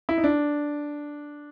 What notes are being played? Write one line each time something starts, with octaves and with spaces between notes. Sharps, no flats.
E4
D#4
D4